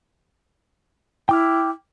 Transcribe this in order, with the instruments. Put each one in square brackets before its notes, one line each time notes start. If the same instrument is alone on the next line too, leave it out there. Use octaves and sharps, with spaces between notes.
[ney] E4 [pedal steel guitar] G5 D6 F6